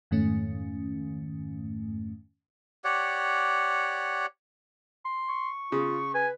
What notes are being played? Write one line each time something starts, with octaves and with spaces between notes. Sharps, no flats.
F2 G#2 D#3 A3 C#4
G4 C#5 D5 F#5
C6
C#6
C#3 F4
B4 G#5